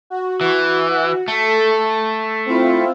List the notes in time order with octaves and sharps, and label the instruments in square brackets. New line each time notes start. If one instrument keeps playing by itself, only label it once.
[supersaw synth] F#4
[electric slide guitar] E3
[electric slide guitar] A3 [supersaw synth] A4
[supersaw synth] C4 E4 F4